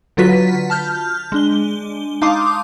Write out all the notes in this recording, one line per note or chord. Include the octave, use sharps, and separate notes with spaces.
D3 F#3 F4 F#4 B4 B6
A5 F6 G6
G#3 D4 G7
D#4 F5 A5 C6 D6 D#6